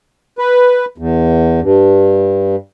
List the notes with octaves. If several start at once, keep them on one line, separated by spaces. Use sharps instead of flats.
B4
E2
G2